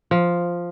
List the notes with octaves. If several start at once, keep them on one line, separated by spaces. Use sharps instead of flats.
F3